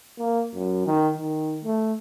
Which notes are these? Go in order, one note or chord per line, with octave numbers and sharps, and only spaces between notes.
A#3
F#2
D#3
D#3
A3